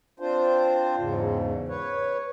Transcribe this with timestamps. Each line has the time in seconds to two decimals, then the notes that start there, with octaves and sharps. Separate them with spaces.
0.20 C4 D4 F4 C5
0.98 E2 G#2 C#3
1.68 B4 C#5